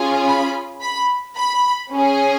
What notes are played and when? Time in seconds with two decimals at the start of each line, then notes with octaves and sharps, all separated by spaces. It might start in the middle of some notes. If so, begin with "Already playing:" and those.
Already playing: C#4 F4 G#4
0.26 B5
0.82 B5
1.37 B5
1.92 C#4 G#4